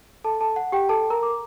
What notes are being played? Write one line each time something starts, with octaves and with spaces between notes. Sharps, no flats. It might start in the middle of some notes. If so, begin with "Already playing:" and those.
A4 A5
A4 A5
F#5
G4 G5
A4 A5
A#4 A#5
D6